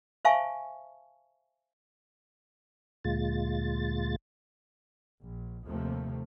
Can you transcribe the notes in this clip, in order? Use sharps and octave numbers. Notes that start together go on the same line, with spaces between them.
C5 E5 F5 G#5 A5 C#6
D2 A#2 G#3 F4 A6
A#1
D#2 C3 F3 A3 A#3